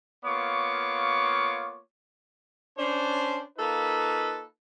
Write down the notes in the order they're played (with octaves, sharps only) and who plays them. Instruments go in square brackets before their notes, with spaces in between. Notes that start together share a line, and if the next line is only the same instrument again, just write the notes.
[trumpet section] A#3 B3 F4 C#5 C#6 D6
[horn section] C#4 D4 C5
A#3 D#4 F4 A4 B4